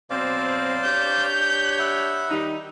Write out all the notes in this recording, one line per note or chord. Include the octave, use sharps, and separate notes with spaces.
B2 F#3 C4 C5 D5 F5
D4 G4 C#5 G6
E5 F#5 B5
D#3 G3 D#4